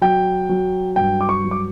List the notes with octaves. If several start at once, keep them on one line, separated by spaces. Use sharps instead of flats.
F#3 G5
F#3
G2 G5
D6
C#6
F#3
D6